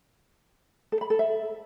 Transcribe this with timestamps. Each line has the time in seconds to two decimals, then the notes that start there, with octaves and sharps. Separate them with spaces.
0.92 A4
1.01 B5
1.10 A4
1.19 E5